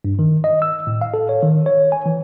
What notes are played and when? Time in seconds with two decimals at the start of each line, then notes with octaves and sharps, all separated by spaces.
0.05 G2
0.19 D#3
0.44 D#5
0.62 E6
0.87 A2
1.01 F5
1.14 A4
1.29 C#5
1.43 D#3
1.66 C#5
1.92 G#5
2.06 E3